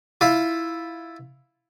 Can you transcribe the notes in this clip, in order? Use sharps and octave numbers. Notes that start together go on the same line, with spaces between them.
E4 F4